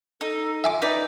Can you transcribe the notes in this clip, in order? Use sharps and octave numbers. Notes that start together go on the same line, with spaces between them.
D#4 A4
F4 E5 G#5 D6
D#4 B4 D5 A#5